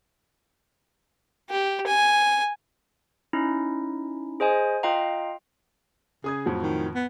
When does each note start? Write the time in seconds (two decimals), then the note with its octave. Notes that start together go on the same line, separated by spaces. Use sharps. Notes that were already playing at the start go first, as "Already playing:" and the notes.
1.50 G4
1.87 G#5
3.33 C#4 D#4 E4
4.40 G#4 C5 D#5 G#5
4.83 F4 D#5 F5 G5 A#5
6.24 C#3 G#4 D#6 G#6
6.46 F2 A2 F#3
6.62 D#3
6.95 B3